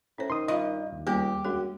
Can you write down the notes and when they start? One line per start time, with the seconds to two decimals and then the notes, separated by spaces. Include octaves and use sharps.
0.18 A2 C#4 C5
0.30 D#3 C6 D#6
0.48 G2 F4 D#5 E5
0.92 D#2
1.07 C#2 G3 A#3 B3 G4
1.45 F#2 G#3 D4 G#4